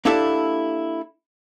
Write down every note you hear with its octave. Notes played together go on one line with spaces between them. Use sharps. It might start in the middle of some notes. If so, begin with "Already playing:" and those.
A#3 D4 E4 G4 A4 E5